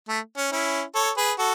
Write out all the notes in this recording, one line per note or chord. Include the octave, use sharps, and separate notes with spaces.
A3
C#4
C#4 E4
A4 C#5
G#4 B4
F#4 A4